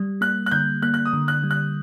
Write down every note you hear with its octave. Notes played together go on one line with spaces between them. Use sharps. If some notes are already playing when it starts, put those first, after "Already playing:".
Already playing: G3
A#3 F#6
F#6
D3 G6
A#3 F#6
F#6
D#6
D3
F#6
G3
F#6